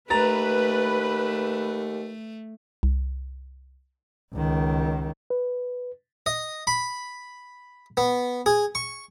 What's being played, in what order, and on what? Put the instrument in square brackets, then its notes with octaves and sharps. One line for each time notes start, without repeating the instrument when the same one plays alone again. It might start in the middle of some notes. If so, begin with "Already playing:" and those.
[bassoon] D#2 [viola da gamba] A3 [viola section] B4 [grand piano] A#5 A6
[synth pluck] C2
[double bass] C#2 D#3
[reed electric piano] B4
[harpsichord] D#5
B5
B3
G#4
C#6